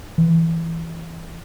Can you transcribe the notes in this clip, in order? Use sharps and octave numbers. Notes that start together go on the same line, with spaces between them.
E3